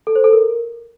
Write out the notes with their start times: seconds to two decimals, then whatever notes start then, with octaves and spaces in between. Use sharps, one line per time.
0.07 A4
0.15 C5
0.24 A4
0.33 A#4